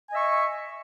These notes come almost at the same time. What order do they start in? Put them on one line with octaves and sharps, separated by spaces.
G#5 D#5 E5 C#6